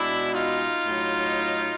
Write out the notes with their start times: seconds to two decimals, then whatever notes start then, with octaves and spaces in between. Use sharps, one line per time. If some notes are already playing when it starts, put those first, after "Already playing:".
Already playing: B2 G#3 D4 E4
0.33 D#4 F4
0.85 A2 F#3